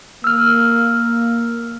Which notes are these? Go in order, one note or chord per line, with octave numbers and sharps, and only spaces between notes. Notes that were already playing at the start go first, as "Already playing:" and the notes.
A#3 E6 F6